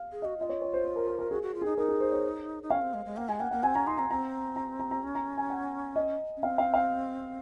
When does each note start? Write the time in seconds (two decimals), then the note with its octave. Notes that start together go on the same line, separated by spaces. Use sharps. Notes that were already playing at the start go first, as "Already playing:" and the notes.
Already playing: F5
0.12 G#4
0.22 D#5
0.25 F#4
0.38 F4 D#5
0.49 C#5
0.62 C#5
0.73 C5
0.84 C5
0.96 A#4
1.07 A#4
1.19 A#4
1.31 F#4 G#4
1.42 F#4
1.54 F4
1.62 G#4
1.65 D#4
1.78 D#4 A#4
1.88 G#4
2.00 C5
2.12 C#5
2.63 D#4
2.70 C#4 F5
2.81 C4
2.94 G#3
3.06 G#3
3.17 A#3 F#5
3.29 G#3 G#5
3.40 A#3 F#5
3.51 A#3 F#5
3.63 C4 G#5
3.75 C#4 A#5
3.87 D#4 C6
3.98 C4 A#5
4.10 C4 A#5
4.56 A#5
4.79 A#5
4.91 A#5
5.03 C#4
5.15 A#5
5.37 G#5
5.50 F#5
5.96 D#5
6.37 C#4
6.43 C4 F5
6.58 F5
6.74 F5